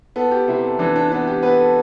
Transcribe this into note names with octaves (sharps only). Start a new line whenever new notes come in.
B3 A4
G4
C3 E4
A4
E3 D4
D4
B3 D4
G4
B3 B4
A4